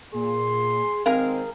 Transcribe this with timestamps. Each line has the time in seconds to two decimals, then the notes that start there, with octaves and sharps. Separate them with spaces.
0.14 A#2 G#4 C6
1.06 D#3 G#3 C4 G#4 A#4 F5